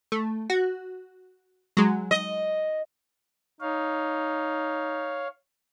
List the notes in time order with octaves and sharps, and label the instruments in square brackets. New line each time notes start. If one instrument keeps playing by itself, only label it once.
[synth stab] A3
F#4
F#3 G#3
[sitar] D#5
[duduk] D#4 [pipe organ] C#5 F5